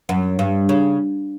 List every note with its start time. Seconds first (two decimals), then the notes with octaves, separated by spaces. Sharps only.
0.09 F#2
0.39 G2
0.69 C#3